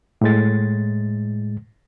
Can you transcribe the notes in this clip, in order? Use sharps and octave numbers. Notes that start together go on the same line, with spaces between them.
A2 G#3 A6